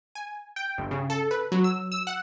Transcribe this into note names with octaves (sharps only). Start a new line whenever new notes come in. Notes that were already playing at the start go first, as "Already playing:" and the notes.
G#5
G5
G1
C#3
A4
B4
F#3
E6
E6
F#5